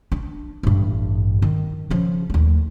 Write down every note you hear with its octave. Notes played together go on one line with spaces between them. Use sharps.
D4
A1 G2
D#3
C#3 F3
D#2 A3